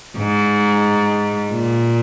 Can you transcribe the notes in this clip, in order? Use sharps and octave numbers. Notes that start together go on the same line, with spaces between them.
G#2
A#2